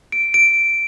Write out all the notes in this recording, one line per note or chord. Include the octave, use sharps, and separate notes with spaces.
D7
D7